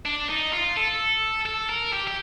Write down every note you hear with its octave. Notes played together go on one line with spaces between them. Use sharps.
D4
D#4
F4
A4
A4
A#4
G4
G4